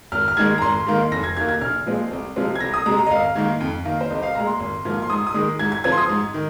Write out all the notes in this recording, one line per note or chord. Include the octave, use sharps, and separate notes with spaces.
G#1 F6
F6
G#2 D#3 G#3 G#6
A#5
G#1 C6
G#2 D#3 A#3
F1 A#6
G#6
D#2 D#3 A#3 G#6
G#6
A#1 F6
A#2 F3 G#3 C4
C2
C3 F3 G#3 C4
G#6
C2 A#6
D#6
C3 G#3 A#5
A#5
D#5
G#1 F5
G#2 D#3 A#3
F2
D#3 A#3
C5
C2 D#5
F5
A#2 G#3 A#5
C6
G#1
G#2 F3 A#3
C6
G#2 D#6
D#6
D#3 G#3
G#2 G#6
G#6
F3 C4 G#6
C6
D#6
G#2
D#3